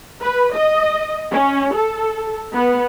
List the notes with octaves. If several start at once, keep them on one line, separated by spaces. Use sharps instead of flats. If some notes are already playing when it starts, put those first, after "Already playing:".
B4
D#5
C#4
A4
B3